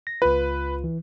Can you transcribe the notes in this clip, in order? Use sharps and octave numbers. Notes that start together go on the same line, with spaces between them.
A#6
C#2 F4 B4
E3